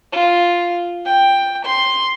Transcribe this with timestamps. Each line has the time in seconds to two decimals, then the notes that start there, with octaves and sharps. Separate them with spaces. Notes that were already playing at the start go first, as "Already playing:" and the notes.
0.13 F4
1.05 G5
1.65 C6